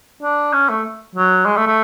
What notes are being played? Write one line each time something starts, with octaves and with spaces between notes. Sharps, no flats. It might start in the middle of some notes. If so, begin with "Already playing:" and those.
D4
C#4
A3
F#3
G#3
A3
A3